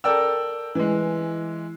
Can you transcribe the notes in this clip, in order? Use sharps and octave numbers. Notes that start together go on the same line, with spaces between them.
A4 A#4 D5 G5 E6
E3 G#3